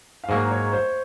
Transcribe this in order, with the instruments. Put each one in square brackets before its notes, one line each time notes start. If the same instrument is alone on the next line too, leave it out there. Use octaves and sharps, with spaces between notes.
[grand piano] F5
[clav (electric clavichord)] G#2 F#3 A#3 [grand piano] D#5
[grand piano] C#5
C5